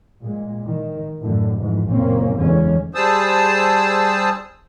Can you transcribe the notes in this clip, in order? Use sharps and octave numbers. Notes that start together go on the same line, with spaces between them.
A#2 G#3
D#3
F#2 A2 D3
F2 G#2 E3
F#1 A#2 A#3 C4 C#4
F#1 E2 D3 E3 G#3 C#4
G3 G#4 C5 A5 D#6 E6